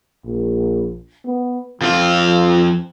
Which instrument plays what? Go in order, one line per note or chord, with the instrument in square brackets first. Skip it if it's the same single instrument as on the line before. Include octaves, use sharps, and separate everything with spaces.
[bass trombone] A#1
B3
[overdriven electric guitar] F2 F4 [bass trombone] F3